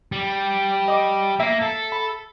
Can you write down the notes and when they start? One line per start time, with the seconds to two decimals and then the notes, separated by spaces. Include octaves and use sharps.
0.12 G3
0.88 D#5 D6
1.40 A#3 E5 C7
1.62 A4
1.92 B5